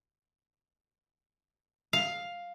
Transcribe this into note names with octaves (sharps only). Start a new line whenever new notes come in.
F5